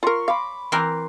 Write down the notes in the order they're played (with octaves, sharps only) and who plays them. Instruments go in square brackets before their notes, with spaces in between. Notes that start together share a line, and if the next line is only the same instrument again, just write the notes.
[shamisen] F4 A#4 [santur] A#5 C6 C#6
[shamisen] F5 [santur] B5 D6
[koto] E3 C4 A#4 [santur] C6